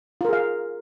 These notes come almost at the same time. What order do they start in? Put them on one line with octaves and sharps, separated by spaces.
F4 A#4 G#4 F5